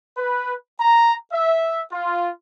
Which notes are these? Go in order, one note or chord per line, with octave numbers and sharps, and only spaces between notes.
B4
A#5
E5
F4